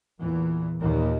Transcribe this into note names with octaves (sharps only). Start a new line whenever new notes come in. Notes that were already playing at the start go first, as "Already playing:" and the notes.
E2 A#2 E3
D#2 A#2 D#3